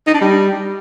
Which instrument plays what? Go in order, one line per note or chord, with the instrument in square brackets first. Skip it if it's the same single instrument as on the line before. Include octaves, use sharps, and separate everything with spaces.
[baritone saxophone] D#4
D4
G3